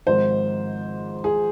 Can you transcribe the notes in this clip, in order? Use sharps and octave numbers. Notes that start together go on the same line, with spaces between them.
G#1 G#2 F3 C5
G#4